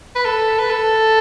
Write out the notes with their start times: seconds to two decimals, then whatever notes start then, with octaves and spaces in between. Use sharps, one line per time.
0.15 B4
0.25 A4
0.59 B4
0.70 A4